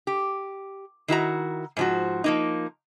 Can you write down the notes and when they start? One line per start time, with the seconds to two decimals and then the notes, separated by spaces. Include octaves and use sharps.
0.07 G4
1.08 D#3 E4 F#4 A#5
1.77 G#2 F3 F#4
2.24 F3 A#3 D#4